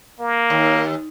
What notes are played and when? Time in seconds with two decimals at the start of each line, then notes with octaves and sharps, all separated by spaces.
0.20 A#3
0.50 D#2